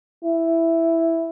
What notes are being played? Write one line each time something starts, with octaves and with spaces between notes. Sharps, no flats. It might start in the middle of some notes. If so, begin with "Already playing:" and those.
E4